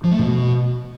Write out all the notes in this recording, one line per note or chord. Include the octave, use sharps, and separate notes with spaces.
F3
A3
B2